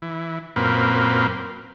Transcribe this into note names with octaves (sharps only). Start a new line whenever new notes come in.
E3
F#2 A#2 A#3 C4 B4